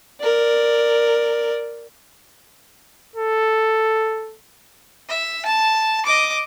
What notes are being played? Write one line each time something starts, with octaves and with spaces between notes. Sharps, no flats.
A#4 D5
A4
E5
A5
D#5 D6